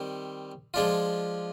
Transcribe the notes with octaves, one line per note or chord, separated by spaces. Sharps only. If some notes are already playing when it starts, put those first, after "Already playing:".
Already playing: D#3 G3 C4
F3 G#3 D4 F4